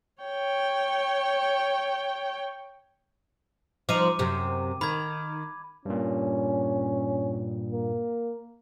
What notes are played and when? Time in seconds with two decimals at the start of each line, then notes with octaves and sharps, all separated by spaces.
0.23 C#5 G5
3.89 F3 D#4 D6 D#7
4.19 F#2 C3
4.81 D#3 B5 G#6
5.85 G2 A#2 C#4
7.72 A#3